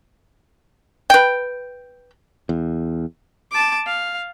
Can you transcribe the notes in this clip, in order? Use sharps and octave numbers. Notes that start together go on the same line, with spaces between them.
B4 G5
E2
A5 D6
F5